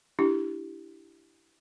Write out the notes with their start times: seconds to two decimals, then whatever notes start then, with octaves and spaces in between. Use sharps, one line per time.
0.19 D4 E4 G4